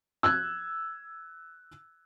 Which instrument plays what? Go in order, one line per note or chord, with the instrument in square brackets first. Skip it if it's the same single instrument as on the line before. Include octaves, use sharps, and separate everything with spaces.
[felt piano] E6 F#6 G#6